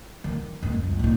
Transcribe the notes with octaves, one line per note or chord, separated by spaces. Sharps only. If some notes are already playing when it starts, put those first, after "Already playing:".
D#3
F#2 G#3
C#2
A#2 D#4